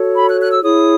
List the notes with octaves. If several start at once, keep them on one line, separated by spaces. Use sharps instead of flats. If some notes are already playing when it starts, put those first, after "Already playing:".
Already playing: F#4 A4 C#5
B5
F#6
F#6
E6
E4 G#4 C#5 D#6